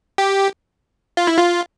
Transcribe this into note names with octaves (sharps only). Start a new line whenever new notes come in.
G4
F4
E4
F4